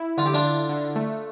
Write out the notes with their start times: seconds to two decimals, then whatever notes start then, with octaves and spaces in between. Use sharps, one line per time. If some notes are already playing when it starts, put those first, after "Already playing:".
Already playing: E4
0.18 D3 F4
0.26 G4
0.34 D4 F4
0.44 D3
0.69 D3
0.96 A3